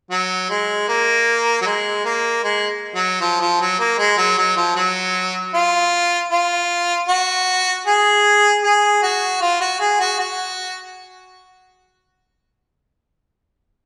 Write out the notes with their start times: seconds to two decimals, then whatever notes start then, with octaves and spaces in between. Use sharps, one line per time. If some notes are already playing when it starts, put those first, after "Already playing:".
0.11 F#3
0.50 G#3
0.88 A#3
1.62 F#3
1.66 G#3
2.05 A#3
2.44 G#3
2.95 F#3
3.21 F3
3.40 F3
3.60 F#3
3.79 A#3
3.98 G#3
4.18 F#3
4.38 F#3
4.57 F3
4.76 F#3
5.54 F4
6.32 F4
7.09 F#4
7.86 G#4
8.64 G#4
9.03 F#4
9.41 F4
9.61 F#4
9.80 G#4
10.00 F#4
10.19 F#4